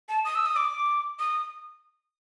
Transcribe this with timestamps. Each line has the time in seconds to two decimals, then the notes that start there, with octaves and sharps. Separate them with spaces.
0.09 A5
0.25 D#6
0.35 E6
0.46 D#6
0.56 D6
1.19 D#6